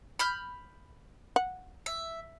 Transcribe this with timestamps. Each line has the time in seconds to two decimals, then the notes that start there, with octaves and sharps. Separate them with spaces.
0.19 B5 F6 G6
1.36 F#5
1.86 E5